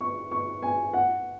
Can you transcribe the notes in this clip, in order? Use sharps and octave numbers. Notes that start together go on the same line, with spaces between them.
C#6
C#6
G#5
F#5